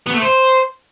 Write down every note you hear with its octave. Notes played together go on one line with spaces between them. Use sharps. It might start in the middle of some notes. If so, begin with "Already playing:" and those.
B3
A3
C5